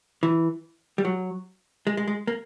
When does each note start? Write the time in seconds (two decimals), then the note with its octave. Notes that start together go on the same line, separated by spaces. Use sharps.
0.23 E3
0.98 G3
1.05 F#3
1.87 G#3
1.97 G#3
2.08 G#3
2.27 A#3